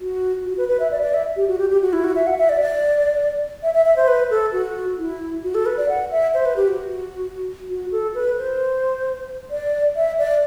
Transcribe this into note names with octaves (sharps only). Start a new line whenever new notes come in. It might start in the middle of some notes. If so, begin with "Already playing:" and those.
F#4
F#4
B4
B4
E5
D5
D5
E5
G4
F#4
G4
G4
F#4
E4
F#4
E5
F#5
E5
D5
D5
E5
E5
E5
C5
B4
A4
F#4
E4
F#4
A4
B4
D5
F#5
E5
C5
B4
G4
F#4
F#4
A4
B4
C5
D5
E5
D5